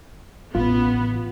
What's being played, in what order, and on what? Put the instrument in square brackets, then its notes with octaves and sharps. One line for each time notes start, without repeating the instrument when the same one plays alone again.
[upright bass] A1 C#3 [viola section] B3 [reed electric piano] F4